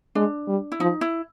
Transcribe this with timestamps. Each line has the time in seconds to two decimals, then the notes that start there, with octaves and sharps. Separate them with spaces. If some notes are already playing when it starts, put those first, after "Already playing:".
0.15 G#3 D4
0.48 G3
0.72 E4
0.80 F3 D#4
1.01 E4